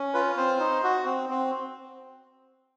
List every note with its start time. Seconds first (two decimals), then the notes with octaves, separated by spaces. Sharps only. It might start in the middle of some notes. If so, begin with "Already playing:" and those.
Already playing: C#4
0.14 F4 B4
0.37 C4 C5
0.60 D#4
0.84 F#4
1.06 C4
1.29 C4